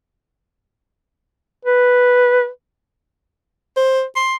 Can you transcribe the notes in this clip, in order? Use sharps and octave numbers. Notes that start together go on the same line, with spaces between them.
B4
C5
C6